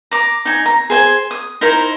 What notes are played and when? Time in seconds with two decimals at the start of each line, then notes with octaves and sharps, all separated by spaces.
0.11 A#5 D6
0.45 D#4 G#5
0.66 A#5
0.90 G#4 C5 G#5
1.31 D#6
1.61 D#4 E4 A#4 C5